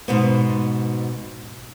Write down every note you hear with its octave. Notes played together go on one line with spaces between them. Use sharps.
G#2 B2 B3